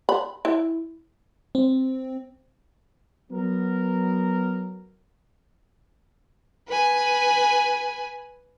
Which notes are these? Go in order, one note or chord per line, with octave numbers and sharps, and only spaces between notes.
B5
E4
C4
F#3 B3 A#4
B4 G#5